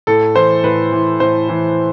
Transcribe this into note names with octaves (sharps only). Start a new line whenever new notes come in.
A2 A4
E3 C5
A2 B4
E3
A2 C5
E3